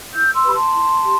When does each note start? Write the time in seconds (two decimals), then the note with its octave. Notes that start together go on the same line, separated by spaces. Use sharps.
0.13 E4 E6 G6
0.33 C6 E6
0.44 G4 B4 B5
0.53 A5 C6
0.74 E4
1.04 G4